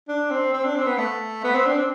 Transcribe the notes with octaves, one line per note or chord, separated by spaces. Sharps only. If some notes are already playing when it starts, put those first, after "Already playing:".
D4
C4
C4
D4
C4
B3
A3
B3
C4
D4
C4